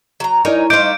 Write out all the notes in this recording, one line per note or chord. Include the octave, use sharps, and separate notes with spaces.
F#3 A#5
D#4 E4 A#4 C#5 D5 G#5 A#5
A3 D#4 C5 F5 D6 G6 D7